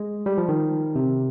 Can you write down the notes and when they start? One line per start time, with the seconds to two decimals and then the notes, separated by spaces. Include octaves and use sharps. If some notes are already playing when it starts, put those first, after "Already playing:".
Already playing: G#3
0.26 G3
0.38 F3
0.49 D#3
0.96 C3